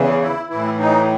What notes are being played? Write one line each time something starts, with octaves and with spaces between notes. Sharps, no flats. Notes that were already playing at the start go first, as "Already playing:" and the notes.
Already playing: E2 C#3 E3
E4
A2 E3 E4
D#4